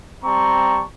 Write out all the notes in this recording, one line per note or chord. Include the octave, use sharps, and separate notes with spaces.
G3 C4 A5 A#5 C#6